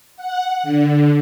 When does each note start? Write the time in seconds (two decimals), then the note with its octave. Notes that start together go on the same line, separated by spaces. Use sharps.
0.17 F#5
0.63 D3